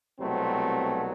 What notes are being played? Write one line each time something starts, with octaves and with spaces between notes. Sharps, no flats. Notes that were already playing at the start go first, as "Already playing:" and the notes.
C2 B2 F#3 A3 C4